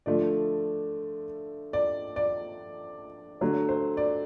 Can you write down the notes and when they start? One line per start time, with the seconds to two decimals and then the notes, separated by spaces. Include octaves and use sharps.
0.06 D3 F3 A3 D5
1.73 D5
2.16 D5
3.41 D3 F#3 A3 C#5
3.69 C5
3.97 D5